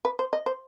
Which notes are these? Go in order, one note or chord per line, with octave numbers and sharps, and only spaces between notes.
B4
C5
D#5
C5